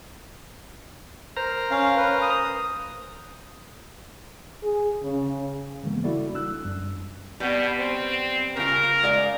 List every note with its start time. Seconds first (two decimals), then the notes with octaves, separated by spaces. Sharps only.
1.37 A#4 C5 A#5
1.71 C#4 F5
1.97 B4
2.22 D#6
4.64 G#4
5.03 C#3
5.83 C#3 E3 G#3 A#3 B3
6.04 G3 E4 F#4 A4 D5
6.34 G1 D4 E6 F#6
6.65 F#2 G3
7.40 B2 G3 B3
7.79 C4
8.57 C#3 F4 A#4
9.03 G#3 D5 F5